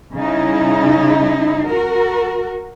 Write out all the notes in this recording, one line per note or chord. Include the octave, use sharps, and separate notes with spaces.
C#3 G3 C#4 D#4 E4
F#4 A#4